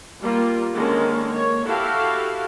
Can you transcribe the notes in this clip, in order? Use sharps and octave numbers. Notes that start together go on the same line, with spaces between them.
G3 A#3 F4
D3 D#3 G#3 A#3 C#4
A#3 C#5
E4 F#4 G4 A4 F5